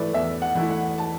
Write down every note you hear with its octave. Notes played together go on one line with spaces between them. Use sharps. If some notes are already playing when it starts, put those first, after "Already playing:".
Already playing: E3 A3 E4 B4 D5
E2 E5
F#5
E3 A3 E4
F#5
A5